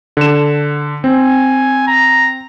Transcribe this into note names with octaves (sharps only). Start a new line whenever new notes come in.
D3 E7
C4 G#5
A#5